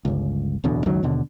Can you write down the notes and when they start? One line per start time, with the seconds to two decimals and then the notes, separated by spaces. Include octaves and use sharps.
0.05 G1 C#2
0.64 D1 E2 B2 D3
0.86 C#2 F#2 D#3 F#3
1.03 D#2 B2 D3